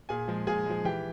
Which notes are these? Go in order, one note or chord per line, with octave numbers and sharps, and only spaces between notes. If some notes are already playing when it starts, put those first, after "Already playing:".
A#2 G#4 G#5
F3 G#3
A#2 G#4 G#5
F3 G#3
E3 G4 G5